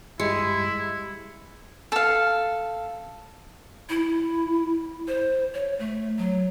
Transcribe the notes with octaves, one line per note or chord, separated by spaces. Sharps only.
G2 G#3 E4 G4 C#7
A4 F5
E4
C5
C#5
A3
F#3